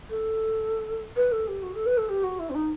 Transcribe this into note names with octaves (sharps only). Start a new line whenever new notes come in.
A4
B4
A4
G4
F#4
A4
B4
A4
G4
F#4
E4
C4
D#4